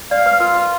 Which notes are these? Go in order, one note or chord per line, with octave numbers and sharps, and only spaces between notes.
D5 F5
B4
F4 A#4
B4